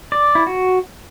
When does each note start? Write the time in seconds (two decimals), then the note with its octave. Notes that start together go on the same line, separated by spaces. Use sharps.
0.12 D5
0.35 E4
0.47 F#4